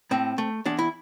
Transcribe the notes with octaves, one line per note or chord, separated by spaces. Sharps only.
A2 C4
A3
E2 D4
E4